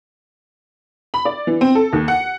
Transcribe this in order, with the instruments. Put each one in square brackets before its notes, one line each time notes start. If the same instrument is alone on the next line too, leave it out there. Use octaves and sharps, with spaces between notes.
[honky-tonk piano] B5
D5
E3
C4
A4
D#2
F#5